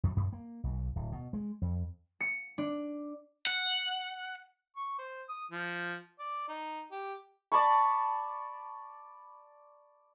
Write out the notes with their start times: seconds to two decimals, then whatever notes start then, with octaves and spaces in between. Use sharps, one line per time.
0.03 F2
0.17 F#2
0.33 A#3
0.64 B1
0.96 D1
1.12 B2
1.33 G#3
1.62 F2
2.21 C#7
2.58 D4
3.47 F#5
4.76 C#6
4.99 C5
5.29 D#6
5.51 F3
6.19 D5
6.48 D#4
6.91 G4
7.52 D5 A5 B5 C#6